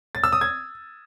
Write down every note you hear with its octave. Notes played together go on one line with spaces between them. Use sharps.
A6
E6
D#6
G#6